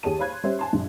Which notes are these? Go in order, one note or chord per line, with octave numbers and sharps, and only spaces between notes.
D#2 G4 G#4 C#5 A5 D#7
C5 C#5 F5 B5 F#6 G#6
C6
G3 C#4 G4 C5 C#5 E5
G#5 A5 C6
A#1 G2